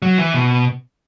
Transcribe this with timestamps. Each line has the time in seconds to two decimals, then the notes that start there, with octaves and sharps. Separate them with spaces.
0.02 F#3
0.18 E3
0.34 B2